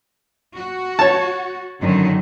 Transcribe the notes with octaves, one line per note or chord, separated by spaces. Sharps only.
F#4
C#5 A5
F#2 D3 D#3